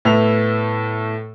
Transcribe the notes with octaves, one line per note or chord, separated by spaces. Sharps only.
A2 A3 B3 E6 F7